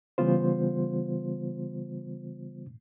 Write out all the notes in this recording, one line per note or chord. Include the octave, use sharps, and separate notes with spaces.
C#3 E3 G3 B3 F4 C5